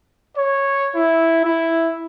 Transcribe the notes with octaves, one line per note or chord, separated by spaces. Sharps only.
C#5
E4
E4